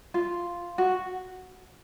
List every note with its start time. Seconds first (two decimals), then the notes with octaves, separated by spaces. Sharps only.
0.14 F4
0.78 F#4